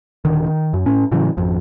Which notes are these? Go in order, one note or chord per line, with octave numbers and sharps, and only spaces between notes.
D#1 D3 D#3
D#3
F#2
A2 C#4
A2 C#3 E3 F#3
G#1 F2